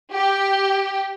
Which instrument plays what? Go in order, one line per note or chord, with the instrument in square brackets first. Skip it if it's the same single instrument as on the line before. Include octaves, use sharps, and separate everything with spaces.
[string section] G4